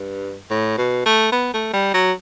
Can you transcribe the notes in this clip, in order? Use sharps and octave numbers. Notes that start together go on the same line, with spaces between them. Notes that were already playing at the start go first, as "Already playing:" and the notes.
Already playing: G2
A2
B2
A3
B3
A3
G3
F#3